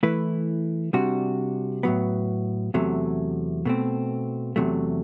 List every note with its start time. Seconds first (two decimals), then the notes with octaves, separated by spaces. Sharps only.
0.03 E3 A3 E4 B4
0.93 C3 G3 D4 F#4
1.83 A2 F#3 B3
2.74 E2 C3 F#3 A3
3.65 B2 A3 C4
4.56 E2 C3 F#3 A3